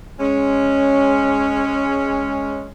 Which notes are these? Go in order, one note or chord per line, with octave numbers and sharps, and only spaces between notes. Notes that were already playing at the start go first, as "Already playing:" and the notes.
G#3 C#4